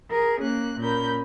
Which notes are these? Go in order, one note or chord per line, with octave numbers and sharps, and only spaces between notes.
G#4 A#4
A#3 C#4 F#6
A#2 C#4 A#4 B5 G6